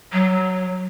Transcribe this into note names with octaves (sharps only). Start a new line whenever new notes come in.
F#3